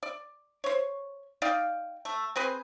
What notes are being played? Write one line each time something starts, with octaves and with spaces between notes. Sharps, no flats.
D5
C5 C#5
D#4 D5 F5 G5
A3
C4 G#4 B4 C5